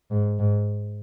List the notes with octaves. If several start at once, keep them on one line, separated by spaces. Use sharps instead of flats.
G#2
G#2